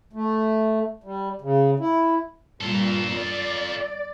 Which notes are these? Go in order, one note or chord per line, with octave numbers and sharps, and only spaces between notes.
A3
G3
C#3
E4
G2 A#2 F4 A4
D5